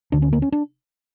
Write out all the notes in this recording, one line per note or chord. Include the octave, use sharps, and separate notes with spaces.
D2 D3 D4
C#4
A#3
C#4
D4